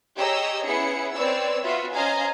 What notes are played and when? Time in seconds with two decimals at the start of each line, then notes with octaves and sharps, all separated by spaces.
0.17 G4 G#4 C#5 D#5 A#5 E6
0.66 B3 C#4 E4 G#4 C#7
1.16 C4 B4 C#5 D5 E6
1.63 B3 F4 F#4 E5
1.93 C#4 C5 D#5 F5 G#5 A#5